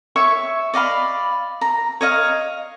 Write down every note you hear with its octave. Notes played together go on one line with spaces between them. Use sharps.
C#5 E5 C#6
D5 D#5 F5 B5
A#5
C#5 D#5 F5